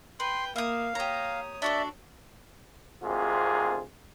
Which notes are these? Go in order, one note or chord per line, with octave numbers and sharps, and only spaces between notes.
B4 G5 C6
A#3 E5 F5 D#6
G4 C#5 A#5 D#6
D4 F#4 A4 D5 E5
G#1 D2 G#2 C3 F4 G#4